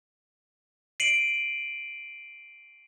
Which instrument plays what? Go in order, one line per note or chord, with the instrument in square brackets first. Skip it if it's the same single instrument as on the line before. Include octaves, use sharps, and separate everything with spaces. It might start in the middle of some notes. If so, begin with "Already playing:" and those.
[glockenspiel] C7 D7 D#7 F#7